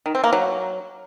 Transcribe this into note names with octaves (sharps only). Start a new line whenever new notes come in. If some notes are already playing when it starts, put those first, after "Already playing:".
D#3
C4
A#3
F#3